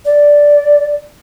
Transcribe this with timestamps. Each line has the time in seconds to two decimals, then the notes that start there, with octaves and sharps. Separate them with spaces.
0.05 D5